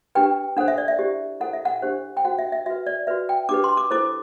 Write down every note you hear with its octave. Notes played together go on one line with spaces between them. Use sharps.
D4 G4 B4 G5
D4 A4 C5 F#5
E5
D5
E5
E4 G4 C5
E4 A4 C5 F#5
E5
F#5
D4 G4 C5
G5
F#4 C5 F#5
E5
E5
F#4 B4 E5
D5
F#4 B4 E5
G5
D4 G4 B4 D6
C6
D6
E4 A4 C5 D6